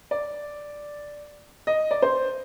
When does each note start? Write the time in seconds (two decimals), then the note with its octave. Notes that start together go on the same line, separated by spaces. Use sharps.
0.11 D5
1.67 D#5
1.91 D5
2.02 C5